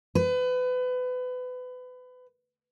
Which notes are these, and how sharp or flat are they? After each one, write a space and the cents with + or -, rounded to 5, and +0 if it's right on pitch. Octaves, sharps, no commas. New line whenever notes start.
B4 +30